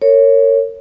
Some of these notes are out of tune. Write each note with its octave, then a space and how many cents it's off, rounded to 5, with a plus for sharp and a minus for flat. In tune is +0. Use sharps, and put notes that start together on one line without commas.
A#4 -35 C#5 +0